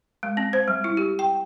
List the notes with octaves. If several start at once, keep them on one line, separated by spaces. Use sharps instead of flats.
G#3
C4
C5
G3
E4
G4
G5